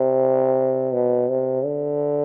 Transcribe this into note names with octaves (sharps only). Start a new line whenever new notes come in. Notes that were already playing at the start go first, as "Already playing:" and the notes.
Already playing: C3
B2
C3
D3